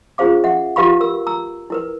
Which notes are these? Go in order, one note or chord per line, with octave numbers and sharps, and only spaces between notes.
C#4 F4 G#4 C5 F5 D6
E5 F#5
F4 G4 B4 F5 B5 C#6
A#4 E6
A#5 E6
E4 A#4 B4